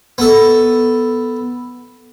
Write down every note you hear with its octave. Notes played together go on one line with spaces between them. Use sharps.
B3 A4